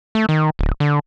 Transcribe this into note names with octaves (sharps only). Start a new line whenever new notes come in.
A3
D#3
D1
D3